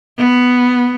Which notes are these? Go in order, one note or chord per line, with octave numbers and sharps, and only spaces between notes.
B3